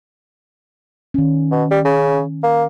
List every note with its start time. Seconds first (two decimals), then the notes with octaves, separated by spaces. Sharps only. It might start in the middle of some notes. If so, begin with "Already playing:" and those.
1.14 D#3 C#4
1.51 B2
1.71 G3
1.85 C#3
2.43 A#3